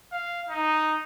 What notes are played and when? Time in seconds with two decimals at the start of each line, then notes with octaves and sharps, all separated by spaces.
0.12 F5
0.49 D#4